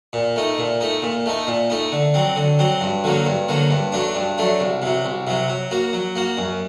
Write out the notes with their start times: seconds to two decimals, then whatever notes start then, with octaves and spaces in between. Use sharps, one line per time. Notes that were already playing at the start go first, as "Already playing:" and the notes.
0.13 A#2
0.36 A3 D#4
0.58 A#2
0.81 A3 D#4
1.02 A#2
1.26 A3 D#4
1.47 A#2
1.70 A3 D#4
1.92 D3
2.14 F#3 C4
2.36 D3
2.59 F#3 C4
2.81 G2
3.04 D3 F#3 A#3
3.26 G2
3.49 D3 F#3 A#3
3.71 G2
3.92 F#3 A3 D4
4.15 G2
4.38 F#3 A3 D4
4.60 C2
4.82 C3 F#3
5.05 C2
5.27 C3 F#3
5.48 F#3
5.71 A#3 F#4
5.93 F#3
6.16 A#3 F#4
6.37 F#2